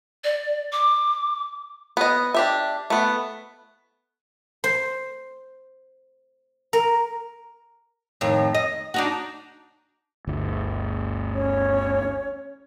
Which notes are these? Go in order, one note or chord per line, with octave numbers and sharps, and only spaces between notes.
D5
D6
B3 D#5
D4 G4 E5
A3 B3
C5
A#4
F2 A2 D#3
D#5
D4 D#4 F#4
G1 D2
C#4 C#5